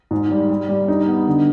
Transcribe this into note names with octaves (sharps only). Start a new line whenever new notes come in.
G#2
G3
G3
G3
D#4
B3
D3